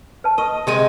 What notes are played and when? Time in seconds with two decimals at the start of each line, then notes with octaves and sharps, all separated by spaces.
0.24 B4 A5
0.38 A#4 D#5 C#6
0.67 C3 G#3 G4 A#4 D#5 G#5